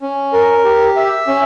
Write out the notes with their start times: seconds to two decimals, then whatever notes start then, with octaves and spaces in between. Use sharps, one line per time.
0.01 C#4
0.33 A#4
0.64 G4
0.96 E5
1.27 C#4